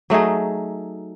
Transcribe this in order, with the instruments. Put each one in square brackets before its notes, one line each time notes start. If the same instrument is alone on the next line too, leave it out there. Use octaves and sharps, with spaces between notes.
[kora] F#3 A3 D#4 G#4